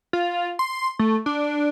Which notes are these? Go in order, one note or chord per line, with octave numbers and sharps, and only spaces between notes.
F4
C6
A3
D4